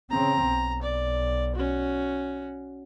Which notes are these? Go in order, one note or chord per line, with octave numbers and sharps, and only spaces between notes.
C#3 C4 A#5
B1
D5
C#4 F#4